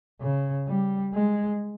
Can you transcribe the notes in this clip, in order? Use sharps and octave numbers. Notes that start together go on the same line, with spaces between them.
C#3
G3
G#3